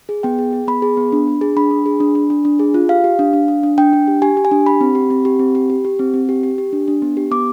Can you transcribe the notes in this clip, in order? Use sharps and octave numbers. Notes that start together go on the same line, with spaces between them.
G#4
B3 G5
G#4
G#4
B3 B5
G#4
B3
D4
D4
G#4
D4 B5
D4
G#4
D4
D4
D4
D4
G#4
F4
G4 F5
G4
D4
D4
D4
D4
D4 G5
D4
G4
G4 G#5
G4
G#5
D4
G4 B5
C4
G4
C4
G4
C4
G4
G4
G4
C4
C4
G4
G4
G4
D4
D4
B3
G4
B3 D6